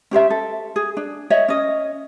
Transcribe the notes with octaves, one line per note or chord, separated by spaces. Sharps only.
C#4 G4 C5 E5
A4
G#4
D4
C#5 D#5 E5
C#4 D#5